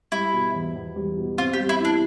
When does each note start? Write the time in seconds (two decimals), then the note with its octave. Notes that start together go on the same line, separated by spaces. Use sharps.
0.12 G3 E4
0.33 B2
0.54 E2
0.75 E2
0.96 G3
1.17 B2
1.37 C4 F4
1.53 G4
1.59 G3
1.69 E4
1.80 D4 E4